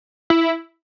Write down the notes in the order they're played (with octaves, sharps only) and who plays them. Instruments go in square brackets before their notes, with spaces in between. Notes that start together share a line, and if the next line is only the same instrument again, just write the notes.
[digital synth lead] E4